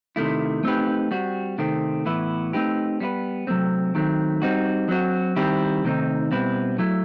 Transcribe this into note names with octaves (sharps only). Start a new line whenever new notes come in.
C3 D#3 A3 E4
A3 C4 D#4 G4 B4
G3 C4 F#4
C3 D#3 A3 C4
A2 E3 B3 E4
A3 C4 D#4 G4 B4
G3 B3 E4 B4
C3 F#3 A3 C4
D#3 F#3 A3 C4
G3 C4 D#4 F#4
F#3 C4 F#4
D#3 G3 C4 E4 G4
C3 D#3 A3 C4 D#4
B2 G3 C4 E4 B4
F#3 A3 E4